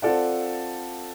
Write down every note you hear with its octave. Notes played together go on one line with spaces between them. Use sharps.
C4 F4 A4 D5 F#5